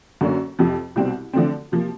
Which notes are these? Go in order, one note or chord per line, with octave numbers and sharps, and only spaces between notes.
F#2 D3 F#3 A#3 C#4
F2 C3 F3
C2 B2 G3 C4
D3 F3 A3 C4
C3 F3 A#3